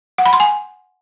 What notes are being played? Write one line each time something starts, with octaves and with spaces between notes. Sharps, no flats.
F#5
B5
C6
G#5